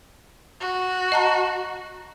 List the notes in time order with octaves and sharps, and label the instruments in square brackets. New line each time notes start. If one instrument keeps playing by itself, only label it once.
[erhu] F#4
[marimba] D#5 A5 A#5